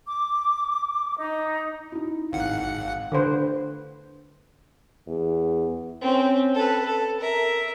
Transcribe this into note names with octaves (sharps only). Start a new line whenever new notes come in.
D6
D#4
D#4 E4
G#1 F5 F#5 C#7
D3 B4 C5
E2
C4 C#4
A4 B4
A4
A#4 E5